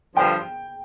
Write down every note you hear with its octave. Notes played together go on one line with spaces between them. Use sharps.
G2 D3 F3 G5